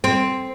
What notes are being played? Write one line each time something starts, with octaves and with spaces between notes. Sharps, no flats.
C4